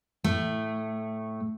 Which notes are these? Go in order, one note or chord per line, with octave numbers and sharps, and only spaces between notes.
A2 A3